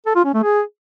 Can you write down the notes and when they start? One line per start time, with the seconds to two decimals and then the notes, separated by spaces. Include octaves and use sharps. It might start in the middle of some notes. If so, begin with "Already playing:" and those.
0.06 A4
0.16 F4
0.25 C#4
0.34 A3
0.43 G#4